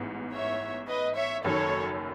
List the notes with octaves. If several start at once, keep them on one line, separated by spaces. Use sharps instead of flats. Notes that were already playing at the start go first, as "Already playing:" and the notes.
Already playing: A1 G#2 E3 B3
C#5 E5
B4 D#5
C#5 E5
F#1 F#2 D#3 A4 C#5